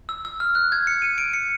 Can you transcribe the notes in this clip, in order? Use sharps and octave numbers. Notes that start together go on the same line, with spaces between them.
E6
E6
F6
F#6
G#6
C#7
D#7
D7
C#7